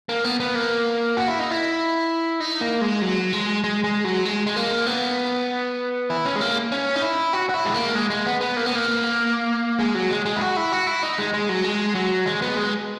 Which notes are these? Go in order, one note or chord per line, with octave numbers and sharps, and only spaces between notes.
A#3
B3
B3
A#3
F#4
E4
D#4
E4
D#4
A#3
G#3
F#3
G#3
G#3
G#3
F#3
G#3
G#3
A#3
B3
E4
C#4
G#3
A#3
C#4
D#4
E4
F#4
F#4
E4
G#3
A#3
G#3
G#3
B3
B3
A#3
B3
A#3
G#3
F#3
G#3
G#3
E4
F#4
E4
F#4
E4
D#4
G#3
G#3
F#3
G#3
F#3
G#3
B3
G#3